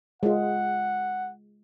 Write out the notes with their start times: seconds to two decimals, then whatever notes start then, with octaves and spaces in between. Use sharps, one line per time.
0.23 G#3 F4 F#5